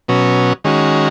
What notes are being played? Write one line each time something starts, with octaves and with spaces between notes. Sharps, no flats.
B2 F#3 C#4
D#3 G#3 C#4 F#4